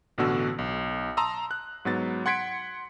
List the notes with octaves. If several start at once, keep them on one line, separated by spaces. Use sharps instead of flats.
A1 B2 D3 F#4 E6
B1
A5 A#5 C6 D#6 E6
F#6
G#2 F#3 B3 A6
F#5 C6 G#6 B6 C#7 D7